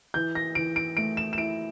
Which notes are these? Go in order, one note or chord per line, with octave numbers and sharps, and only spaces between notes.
E3 G6
A#6
E3 D7
D7
A3 D7
E7
E7
E4 D7